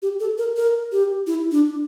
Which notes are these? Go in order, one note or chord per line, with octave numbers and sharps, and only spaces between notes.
G4
A4
A#4
A#4
G4
E4
D4